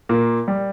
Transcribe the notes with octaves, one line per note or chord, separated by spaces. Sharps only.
A#2 A#3
G3